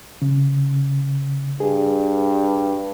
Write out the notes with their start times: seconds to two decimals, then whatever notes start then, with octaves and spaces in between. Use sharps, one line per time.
0.22 C#3
1.60 G2 G#4